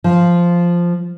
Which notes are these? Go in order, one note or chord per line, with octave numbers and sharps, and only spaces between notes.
F3